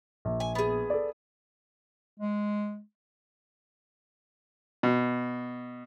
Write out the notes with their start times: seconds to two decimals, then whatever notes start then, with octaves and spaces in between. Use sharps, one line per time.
0.25 A#1
0.40 G#5
0.55 B3 G#4
0.90 A4 D5
2.20 G#3
4.83 B2